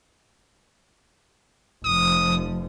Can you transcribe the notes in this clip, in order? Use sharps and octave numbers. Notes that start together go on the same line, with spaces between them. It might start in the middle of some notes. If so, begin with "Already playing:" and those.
F1 F3 D#6